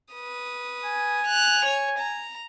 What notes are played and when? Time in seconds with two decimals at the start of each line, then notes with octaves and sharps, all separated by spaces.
0.13 B4 D#6
0.85 G#5
1.26 F#6 F7
1.65 C#5
1.99 A#5